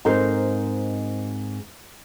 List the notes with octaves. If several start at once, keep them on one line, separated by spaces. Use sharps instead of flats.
G#2 C4 D#4 A#4 C5